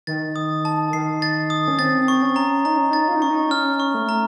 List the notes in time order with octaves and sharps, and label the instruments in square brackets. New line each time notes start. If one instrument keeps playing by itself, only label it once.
[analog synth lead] D#3 [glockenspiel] A6
[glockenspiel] D#6
A5
[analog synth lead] D#3 [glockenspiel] C7
[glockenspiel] A6
D#6
[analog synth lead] C#4
[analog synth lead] C4 [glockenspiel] A6
[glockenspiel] C#6
[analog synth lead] C#4
[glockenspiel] A#5
[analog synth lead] D#4 [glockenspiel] A#5
[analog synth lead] C#4
[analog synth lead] D#4 [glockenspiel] A6
[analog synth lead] F4
D#4
[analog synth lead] C#4 [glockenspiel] C#6
[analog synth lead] D#4
[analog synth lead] C#4 [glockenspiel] F6
[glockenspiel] C#6
[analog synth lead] A3
[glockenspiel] A#5